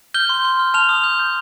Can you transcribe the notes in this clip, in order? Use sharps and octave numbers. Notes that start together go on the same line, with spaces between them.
F6 G6 G7
C6
C6
F6
A5 F6 F7
D#6
G6
G6